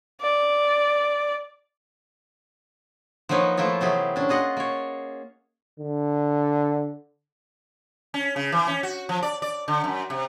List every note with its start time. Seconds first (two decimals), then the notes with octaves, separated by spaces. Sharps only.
0.21 D5
3.29 F3 F#3 A#3 D#4 B4 C#5
3.57 F3 A3 A#3 E4 F4
3.81 C3 E3 F#3 G4 G#4
4.16 C#4 D4
4.29 F4 G#4 D#5 F#5
4.57 A#3 C#5
5.79 D3
8.14 C#4
8.36 C#3
8.52 E3
8.67 C#4
8.83 F#4
9.09 F3
9.23 D5
9.42 D5
9.68 D3
9.84 F#2
10.10 C3